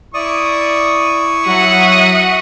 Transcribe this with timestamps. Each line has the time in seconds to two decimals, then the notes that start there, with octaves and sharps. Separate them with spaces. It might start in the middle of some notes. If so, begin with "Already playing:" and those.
0.14 E4 D5 C#6 D#6
1.46 F#3 F#4 E5 F#5 D#6